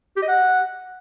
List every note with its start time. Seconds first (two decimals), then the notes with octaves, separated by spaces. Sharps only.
0.16 G4
0.22 D#5
0.28 F#5